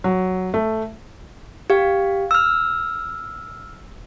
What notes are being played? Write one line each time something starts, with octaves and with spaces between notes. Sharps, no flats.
F#3
A3
G4 F5
E6 F6